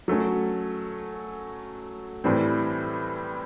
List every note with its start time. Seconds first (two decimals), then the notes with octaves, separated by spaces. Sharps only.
0.08 F#3 A3 C#4
2.24 A2 E3 G3 C4